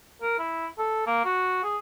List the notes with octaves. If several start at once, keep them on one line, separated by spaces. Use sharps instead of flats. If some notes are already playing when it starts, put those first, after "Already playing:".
A#4
E4
A4
A#3
F#4
G#4